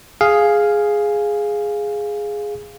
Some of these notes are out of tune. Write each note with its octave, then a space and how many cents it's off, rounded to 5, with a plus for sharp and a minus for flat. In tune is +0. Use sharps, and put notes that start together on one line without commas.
G#4 +0 F5 +0